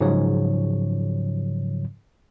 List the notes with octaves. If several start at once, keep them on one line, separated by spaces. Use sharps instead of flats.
G#2 C#3 F3 F#3 C#5